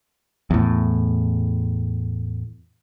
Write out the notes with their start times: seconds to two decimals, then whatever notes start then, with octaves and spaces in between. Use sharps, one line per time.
0.50 E2 A2